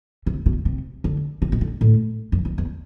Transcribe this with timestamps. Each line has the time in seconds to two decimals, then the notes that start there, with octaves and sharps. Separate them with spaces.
0.26 C3
0.46 B2
0.65 C3
1.04 D3
1.42 C3
1.52 B2
1.61 D3
1.81 A2
2.32 F#2
2.45 E2
2.58 E2